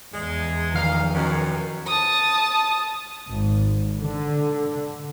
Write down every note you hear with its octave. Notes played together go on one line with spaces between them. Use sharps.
E2 G#3
D#3 F3 D#4 F5
F#2 B2
A5 D#6
G#1
D3